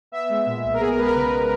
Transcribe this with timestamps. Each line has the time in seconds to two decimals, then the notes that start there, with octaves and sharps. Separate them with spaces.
0.12 B3 E5
0.29 G#3
0.46 A#2
0.64 B1
0.74 A#4
0.80 B3 G#4
0.89 A#4
0.97 G#3 B4
1.06 A#4
1.15 C#3 B4